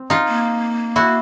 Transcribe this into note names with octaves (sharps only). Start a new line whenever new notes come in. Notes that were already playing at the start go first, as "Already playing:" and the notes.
Already playing: C4
D#4 F4
A#3
E4 F#4